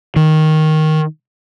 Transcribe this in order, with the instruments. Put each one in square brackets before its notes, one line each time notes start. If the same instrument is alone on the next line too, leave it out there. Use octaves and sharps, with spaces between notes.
[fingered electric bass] D#3